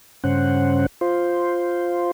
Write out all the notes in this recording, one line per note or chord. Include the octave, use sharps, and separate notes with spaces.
G2 C#3 C#4 C5 F#5
F4 C5